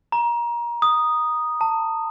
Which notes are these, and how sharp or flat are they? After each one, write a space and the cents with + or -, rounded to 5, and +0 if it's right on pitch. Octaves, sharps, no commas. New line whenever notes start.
A#5 +25
D#6 -5
A5 +35